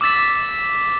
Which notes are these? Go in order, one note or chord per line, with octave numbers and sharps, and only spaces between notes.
D6 E6 A6 B6